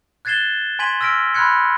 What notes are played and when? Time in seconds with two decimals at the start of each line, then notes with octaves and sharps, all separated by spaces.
0.25 F#6 G#6 A6 C7 E7 G7
0.79 G#5 C6 G#6 B6 D#7 F#7
1.01 E6 F6 A#6 B6 D7
1.34 B5 C6 F6 F#6 G#6 C#7